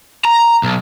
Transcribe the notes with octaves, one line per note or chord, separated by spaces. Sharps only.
A#5
B1